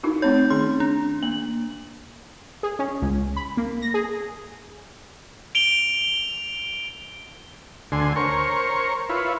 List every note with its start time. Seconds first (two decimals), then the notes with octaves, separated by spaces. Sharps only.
0.03 D#4 E4 F#4
0.22 A3 C4 D#4 C#5 G6
0.50 D#3 C#4 G#4 C6
0.80 D4
1.23 A#3 F#7
2.63 G#4
2.79 C#4
3.02 C#2
3.36 B5
3.57 A#3
3.82 A#6
3.94 G#4
5.55 D7 F7 G7
7.92 D2 D3 G#5 C6
8.16 A#4 C5 C#5 C#6
9.09 E4 F4 B4 C#5